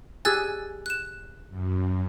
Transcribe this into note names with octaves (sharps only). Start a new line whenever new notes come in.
G4 G#4 G#5 E6 F#6 A6
F#6 E7
F#2